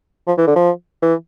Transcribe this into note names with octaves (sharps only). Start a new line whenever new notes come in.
F3
E3
D3
F3
E3